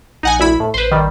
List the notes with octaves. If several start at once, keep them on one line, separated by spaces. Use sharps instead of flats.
A#1 D#4 F#5 G#5
D2 E4 B5
A2
A1 B4 C5
A1 D#3 G3